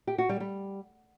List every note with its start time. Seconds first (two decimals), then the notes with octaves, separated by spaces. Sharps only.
0.07 G4
0.18 F#4
0.29 G3
0.40 G3